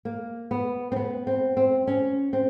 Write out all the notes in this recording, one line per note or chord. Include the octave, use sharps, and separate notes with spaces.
A#3
B3
C4
B3
C4
C4
C#4
C4